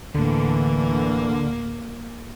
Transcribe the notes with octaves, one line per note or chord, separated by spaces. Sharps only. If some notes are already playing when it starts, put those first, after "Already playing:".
D2 A2 D3 E3 A#3